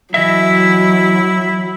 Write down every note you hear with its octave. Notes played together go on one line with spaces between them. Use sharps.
E3 F#3 E4 D#5 E5